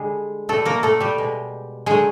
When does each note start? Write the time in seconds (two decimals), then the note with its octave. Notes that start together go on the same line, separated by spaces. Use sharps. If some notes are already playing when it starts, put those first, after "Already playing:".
Already playing: D3 G3 G#3 G#4
0.49 B2 G3 A3 A4
0.65 A#3 A#4
0.83 A3 A4
1.00 G3 G4
1.18 B2 G#3
1.86 D3 F#3 G#3 A3 G#4